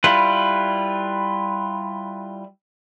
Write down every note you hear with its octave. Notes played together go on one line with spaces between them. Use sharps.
G3 E4 F4 B4